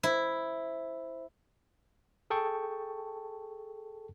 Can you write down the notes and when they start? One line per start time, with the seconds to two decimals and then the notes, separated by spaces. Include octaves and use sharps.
0.03 E4 C5
2.30 G#4 A4 G5 A5 C#6